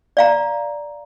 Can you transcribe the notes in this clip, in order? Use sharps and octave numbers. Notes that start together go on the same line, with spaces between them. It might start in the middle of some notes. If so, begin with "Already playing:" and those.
D5 F5 A#5